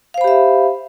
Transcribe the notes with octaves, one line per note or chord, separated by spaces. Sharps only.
G4 C5 E5 F5 B5